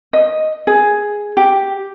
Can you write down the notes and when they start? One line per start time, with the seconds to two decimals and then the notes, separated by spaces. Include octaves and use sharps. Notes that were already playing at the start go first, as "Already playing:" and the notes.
0.13 D#5
0.67 G#4
1.37 G4